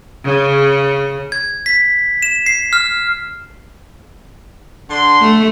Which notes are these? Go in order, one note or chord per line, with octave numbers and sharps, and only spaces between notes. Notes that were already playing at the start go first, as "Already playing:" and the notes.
C#3
G#6
B6
E7
C7
F6
D3 C6
A3